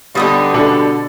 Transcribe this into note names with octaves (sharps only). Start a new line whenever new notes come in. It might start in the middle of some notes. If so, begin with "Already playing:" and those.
D3 G3 B3 D#4 G4 D#6 E6
B2 D4 A4